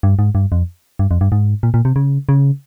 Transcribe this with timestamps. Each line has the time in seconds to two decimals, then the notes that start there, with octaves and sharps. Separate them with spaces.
0.03 G2
0.19 G#2
0.35 G2
0.52 F2
0.99 G2
1.11 F2
1.21 G2
1.32 G#2
1.63 A#2
1.74 A#2
1.85 C3
1.96 C#3
2.29 C#3